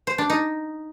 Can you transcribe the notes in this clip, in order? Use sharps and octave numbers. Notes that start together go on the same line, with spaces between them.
C5
D4
D#4